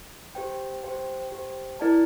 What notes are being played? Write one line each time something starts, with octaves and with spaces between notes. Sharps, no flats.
G4 C5 G5
G4 C5 G5
G4 C5 G5
E4 A#4 D5 A5